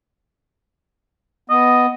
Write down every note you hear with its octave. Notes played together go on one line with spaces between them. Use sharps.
B3 D#5